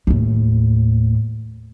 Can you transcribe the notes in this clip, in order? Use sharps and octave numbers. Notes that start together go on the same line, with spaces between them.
D#2 A2